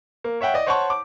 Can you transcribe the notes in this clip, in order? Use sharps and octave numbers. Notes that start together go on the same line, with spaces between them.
A#3
C#5 E5 F#5 G5
D5 D#5
C5 C#5 F#5 A5 C6 C#6
D6